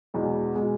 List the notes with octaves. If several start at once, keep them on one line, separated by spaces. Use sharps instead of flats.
E2 B2 G#3
B2 G#3